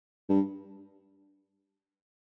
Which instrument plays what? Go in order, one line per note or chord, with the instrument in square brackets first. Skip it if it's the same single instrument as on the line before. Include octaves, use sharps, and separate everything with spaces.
[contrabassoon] G2